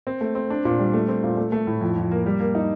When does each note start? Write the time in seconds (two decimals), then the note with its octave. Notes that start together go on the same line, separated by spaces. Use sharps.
0.07 C4
0.21 A3
0.35 C4
0.50 D4
0.65 A#2
0.80 G3
0.93 A3
1.08 C4
1.24 A#2
1.37 A3
1.52 A3
1.67 A2
1.81 F2
1.96 F2
2.11 A#3
2.26 G3
2.40 A#3
2.55 D#4